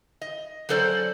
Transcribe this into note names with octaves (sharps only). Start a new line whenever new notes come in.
D#5
F#3 C#4 A4 C5 D5